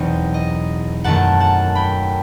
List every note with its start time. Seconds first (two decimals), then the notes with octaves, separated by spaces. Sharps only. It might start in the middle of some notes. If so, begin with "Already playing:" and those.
Already playing: E2 B2 F#3 C4 D#4 D#5
0.34 D#5
1.04 F#2 D#3 A3 F#5 A5
1.40 F#5 A5
1.75 G5 B5